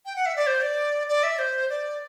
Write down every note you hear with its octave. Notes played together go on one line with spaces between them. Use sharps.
G5
F#5
E5
D5
C5
D5
D5
E5
C5
D5